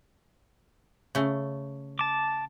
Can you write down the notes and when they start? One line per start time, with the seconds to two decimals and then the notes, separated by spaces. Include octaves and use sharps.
1.15 C#3 A3
1.99 A5 D6